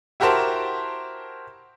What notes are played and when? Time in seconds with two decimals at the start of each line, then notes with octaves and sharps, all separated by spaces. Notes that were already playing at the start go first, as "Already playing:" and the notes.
0.20 E4 F#4 G4 A#4 C5 A5